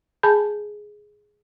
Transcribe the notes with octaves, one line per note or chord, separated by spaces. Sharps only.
G#4 G#5 A5 B5 G6